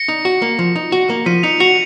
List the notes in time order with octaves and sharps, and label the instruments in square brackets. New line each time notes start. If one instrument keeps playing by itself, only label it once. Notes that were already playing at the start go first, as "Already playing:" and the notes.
Already playing: [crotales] A#6 C#7
[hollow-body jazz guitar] D#4
F#4
A#3
F3
D#4
F#4
A#3
[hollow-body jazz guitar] F3 [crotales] B6 D#7
[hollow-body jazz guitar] D#4 [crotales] C#7 F7
[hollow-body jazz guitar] F#4 [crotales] C#7 F7